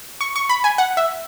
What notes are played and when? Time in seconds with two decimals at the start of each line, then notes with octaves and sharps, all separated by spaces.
0.21 C#6
0.36 C#6
0.49 B5
0.64 G#5
0.78 F#5
0.97 E5